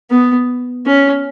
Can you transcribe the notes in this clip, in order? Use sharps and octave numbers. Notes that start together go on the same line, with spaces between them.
B3
C#4